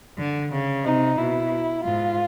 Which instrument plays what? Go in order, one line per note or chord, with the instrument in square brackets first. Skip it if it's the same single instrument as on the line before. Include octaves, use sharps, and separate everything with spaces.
[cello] D3
C#3
[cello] C3 [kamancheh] D#4
[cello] B2 [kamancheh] E4
[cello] G#2 [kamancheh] F4